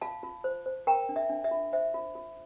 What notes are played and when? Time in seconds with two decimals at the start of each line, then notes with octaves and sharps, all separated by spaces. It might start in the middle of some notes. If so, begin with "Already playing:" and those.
0.01 F4 F5 A5
0.23 F4
0.44 C5
0.66 C5
0.87 A#4 G5 A#5
1.09 D4
1.16 E5
1.30 D4
1.44 E5
1.51 F4
1.73 C5 E5
1.94 F4
2.15 F4